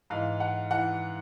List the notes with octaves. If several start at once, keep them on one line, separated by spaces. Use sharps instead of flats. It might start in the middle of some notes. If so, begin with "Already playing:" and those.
G#2 E3 F5
F#5
E3 F#5